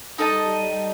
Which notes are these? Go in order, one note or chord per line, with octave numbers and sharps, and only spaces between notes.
G3 D#4 A4 D#5 A5